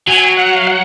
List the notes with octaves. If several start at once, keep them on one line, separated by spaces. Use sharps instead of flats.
F#3 G#5
F#5
F5
F#5